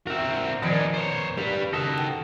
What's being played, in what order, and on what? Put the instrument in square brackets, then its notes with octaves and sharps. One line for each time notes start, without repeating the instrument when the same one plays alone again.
[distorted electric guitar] C4 A#4 [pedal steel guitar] F#4 E5
[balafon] D#3 F3 [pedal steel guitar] B3 A#4 G#5 [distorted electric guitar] D4 D#4
[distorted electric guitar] C5 C#5
[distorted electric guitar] G3 B4 [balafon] G4
[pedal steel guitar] D#3 A4 D#5 [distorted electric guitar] F#4 A5
[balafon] G5